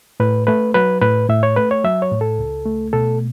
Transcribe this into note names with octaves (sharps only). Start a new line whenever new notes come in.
A2 B4
A3 B4
F#3 B4
A2 B4
A2 E5
C#5
A3 B4
C#5
F#3 E5
C#5
A2
A4
C#2
A3
B2 A4